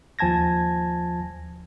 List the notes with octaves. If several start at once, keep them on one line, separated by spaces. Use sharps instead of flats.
D#2 F3 G#5 A5 G#6 A#6